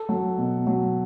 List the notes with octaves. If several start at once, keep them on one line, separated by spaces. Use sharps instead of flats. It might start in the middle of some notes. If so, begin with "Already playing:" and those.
Already playing: A4
F#3
B2
F#3